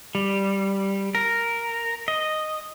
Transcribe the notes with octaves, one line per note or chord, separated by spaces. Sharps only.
G3
A#4
D#5